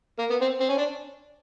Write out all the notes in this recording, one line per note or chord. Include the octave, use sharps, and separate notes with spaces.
A#3
B3
C4
C4
C#4
D4